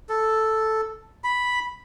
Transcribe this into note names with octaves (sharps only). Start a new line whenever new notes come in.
A4
B5